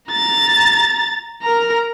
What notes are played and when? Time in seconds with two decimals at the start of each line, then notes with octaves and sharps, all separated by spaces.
0.12 A#5 A6
1.43 A#4 A#5